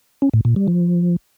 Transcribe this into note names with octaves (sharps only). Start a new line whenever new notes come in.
C#4
A2
A#2
G3
F3